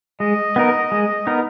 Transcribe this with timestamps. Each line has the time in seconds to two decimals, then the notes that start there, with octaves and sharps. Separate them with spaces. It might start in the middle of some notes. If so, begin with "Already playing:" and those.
0.20 G#3 D#5
0.56 B3 D#4 A#4
0.92 G#3
1.27 B3 D#4 A#4